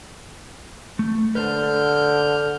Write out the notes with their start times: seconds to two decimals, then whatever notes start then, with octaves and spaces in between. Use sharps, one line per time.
0.99 A3
1.35 D3 B4 C5 A5 F6 G6